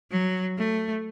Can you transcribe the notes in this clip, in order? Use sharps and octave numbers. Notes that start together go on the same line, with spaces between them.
F#3
A3